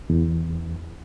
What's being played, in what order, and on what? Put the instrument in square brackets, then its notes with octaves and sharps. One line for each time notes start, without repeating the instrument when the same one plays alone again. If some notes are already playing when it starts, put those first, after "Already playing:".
[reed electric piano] E2